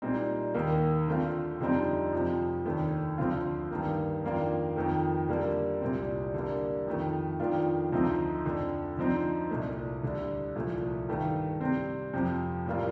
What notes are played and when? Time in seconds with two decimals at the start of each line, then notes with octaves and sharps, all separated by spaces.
0.02 A#2 G3 C4 D#4
0.54 D#2 D#3 A#3
1.07 D3 A3 C4 F4
1.60 F2 D3 G3 C4 D#4
2.13 F2 C3 F3
2.65 D#2 D#3 A3 D4
3.18 D2 D3 F3 C4 F4
3.71 G2 D#3 A#3
4.23 F2 D#3 A#3 D4 F4
4.76 F2 D#3 A3
5.29 D3 G3 A#3
5.82 C2 A#2 G3 C4
6.34 D3 G3 A#3
6.87 F2 D#3 A3
7.40 F2 D#3 A3 D4 F4
7.92 D2 D3 F3 C4 D#4
8.45 F2 D3 A3
8.97 D3 F3 C4 D#4
9.51 C2 A#2 A3
10.03 D2 D3 G3
10.55 C2 A#2 F3 A3
11.08 G2 D#3 A3
11.61 C3 G3 C4
12.13 F2 C3 F3
12.66 A2 G3 A#3 F4